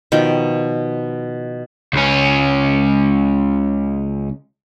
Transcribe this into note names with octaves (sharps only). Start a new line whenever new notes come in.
B2 D#3 F3 G5
C#2 C#4